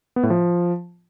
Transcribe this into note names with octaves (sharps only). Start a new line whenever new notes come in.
B3
A2
F3